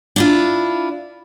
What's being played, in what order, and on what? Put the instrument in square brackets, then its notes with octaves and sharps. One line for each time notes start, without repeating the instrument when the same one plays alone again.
[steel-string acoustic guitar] D4 E4 F4